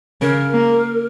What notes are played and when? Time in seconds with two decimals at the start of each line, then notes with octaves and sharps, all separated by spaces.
0.21 C#3 A#4
0.54 A#3